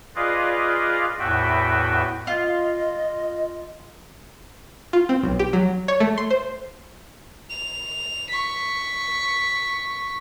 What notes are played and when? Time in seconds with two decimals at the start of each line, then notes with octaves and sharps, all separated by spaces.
0.16 F4 G#4 B4 D5 D#5 F5
1.19 E2 A2 F#4 B4 E5 G5
2.27 F4 D#5
4.93 F4
5.09 C4
5.23 B1
5.39 G4
5.53 F#3
5.88 C#5
6.00 A3
6.18 C6
6.30 C5
7.50 F7
8.31 C#6 B6